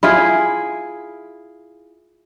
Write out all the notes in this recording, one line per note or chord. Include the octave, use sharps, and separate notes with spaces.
E4 F4 G#4